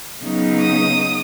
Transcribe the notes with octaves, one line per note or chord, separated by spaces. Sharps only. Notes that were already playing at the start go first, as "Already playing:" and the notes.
C#3 F#3 B3 D#4
D#6